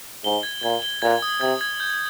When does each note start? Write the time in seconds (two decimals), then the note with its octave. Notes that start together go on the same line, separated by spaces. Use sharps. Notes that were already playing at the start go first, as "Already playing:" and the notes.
0.24 G#2 G7
0.43 G#6
0.63 A#2 G#6
0.82 G7
1.02 A#2 G#6
1.22 D#6
1.41 C3 G#6
1.61 G#6
1.80 G6